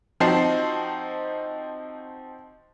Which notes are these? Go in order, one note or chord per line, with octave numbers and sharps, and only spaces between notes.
F3 C4 D#4 F#4 A5 C7